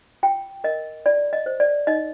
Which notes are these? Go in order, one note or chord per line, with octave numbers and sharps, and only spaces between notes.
F4 G5
A#4 D#5
F4 D5
D#5
C5
D5
D#4 D#5